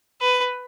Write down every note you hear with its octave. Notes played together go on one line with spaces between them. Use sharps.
B4